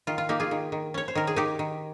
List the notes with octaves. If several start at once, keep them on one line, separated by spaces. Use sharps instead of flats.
D#3 F4
F4
A#3 D#4 G4
F4 G#4
D#3
D#3
C#4 C#5
C5
D#3 A#4
G#4
D#3 D#4 G4
D#3